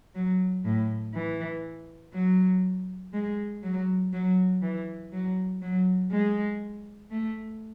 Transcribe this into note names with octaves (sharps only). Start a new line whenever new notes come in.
F#3
A2
E3
F#3
G#3
F#3
F#3
E3
F#3
F#3
G#3
A3